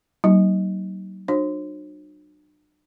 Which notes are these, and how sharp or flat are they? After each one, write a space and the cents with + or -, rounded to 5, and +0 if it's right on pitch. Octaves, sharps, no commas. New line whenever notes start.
F#3 +45 A#3 +0 D#4 +0
D4 +40 F#4 -30 C5 +40